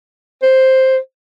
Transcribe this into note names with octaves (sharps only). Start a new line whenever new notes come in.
C5